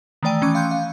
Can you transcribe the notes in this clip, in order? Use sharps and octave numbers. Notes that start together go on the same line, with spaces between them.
D#3 E3 A3 D5 G5 D#7
E3 C#4 C#6 D6 C#7
F5 G5 C6 F#6 G6
F5